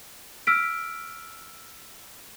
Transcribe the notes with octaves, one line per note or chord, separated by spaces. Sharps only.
E6 F6 B6 D7